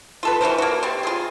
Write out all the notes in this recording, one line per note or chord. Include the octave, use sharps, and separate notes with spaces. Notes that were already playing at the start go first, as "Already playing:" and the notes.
F4 A4 B4
E3 F#4 A#4 C5
A#3 F#4
G3 C4
F4 G#4